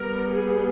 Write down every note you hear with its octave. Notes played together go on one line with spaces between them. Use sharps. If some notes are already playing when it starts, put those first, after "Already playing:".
Already playing: G3 B3 A#4
G#4